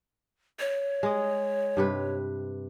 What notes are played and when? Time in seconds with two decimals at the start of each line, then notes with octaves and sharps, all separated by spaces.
0.60 C#5
1.03 G#3 D#5
1.77 G2 C3 B4